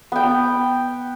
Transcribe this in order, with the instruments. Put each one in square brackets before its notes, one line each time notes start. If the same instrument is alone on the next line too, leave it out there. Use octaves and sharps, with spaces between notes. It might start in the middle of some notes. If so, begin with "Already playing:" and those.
[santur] B3 G5